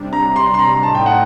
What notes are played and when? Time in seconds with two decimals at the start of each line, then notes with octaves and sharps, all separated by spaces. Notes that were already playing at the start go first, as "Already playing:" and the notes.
Already playing: C3 G3 D4
0.13 A#5
0.36 C6
0.54 C6
0.59 A#5
0.82 A2 A3 D#4 A5
0.95 G5
1.06 F#5